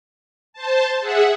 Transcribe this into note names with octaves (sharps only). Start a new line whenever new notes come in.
C5 A5
G#4 E5 F#5